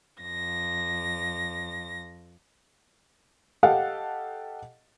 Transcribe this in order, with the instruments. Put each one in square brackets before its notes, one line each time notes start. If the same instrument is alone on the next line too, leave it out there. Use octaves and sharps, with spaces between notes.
[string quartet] F2 A#6
[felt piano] G4 A4 D#5 F5 F#5